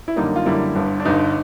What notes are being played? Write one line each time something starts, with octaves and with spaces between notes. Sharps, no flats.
E4
F#2 D3 G3 A#3 D#4
F4
F#2 D3 G3 A#3 E4
G1 G2 D3
D4
G1 G2 D3 D#4